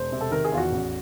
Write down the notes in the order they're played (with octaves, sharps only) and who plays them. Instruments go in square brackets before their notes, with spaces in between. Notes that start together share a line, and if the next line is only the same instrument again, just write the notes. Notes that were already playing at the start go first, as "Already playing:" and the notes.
Already playing: [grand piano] E1 C5
C3
A4
D#3 A#4
G#4
E2 F4
F#4
A1